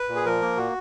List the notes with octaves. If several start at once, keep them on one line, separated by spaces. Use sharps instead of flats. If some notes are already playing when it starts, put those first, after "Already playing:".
Already playing: B4
A#2
G#4
F3 A#4
A#3
A#2 F#4